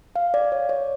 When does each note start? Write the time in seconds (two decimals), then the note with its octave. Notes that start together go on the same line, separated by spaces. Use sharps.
0.16 F5
0.34 D5
0.52 C#5
0.69 C#5